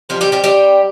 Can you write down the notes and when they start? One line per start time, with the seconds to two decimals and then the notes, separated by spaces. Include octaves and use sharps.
0.09 C3 F3 G3 F4
0.21 G3 G4
0.32 G3 G4
0.44 G3 G4